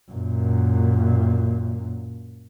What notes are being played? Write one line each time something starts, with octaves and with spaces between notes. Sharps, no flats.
F#2 A#2